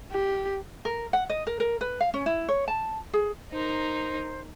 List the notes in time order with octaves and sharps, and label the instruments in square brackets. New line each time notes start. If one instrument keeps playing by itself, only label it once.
[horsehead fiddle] G4
[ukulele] A#4
F#5
D#5
A#4
A#4
B4
F5
C#4
E4
C#5
A5
G#4
[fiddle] D#4 A#4 [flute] C5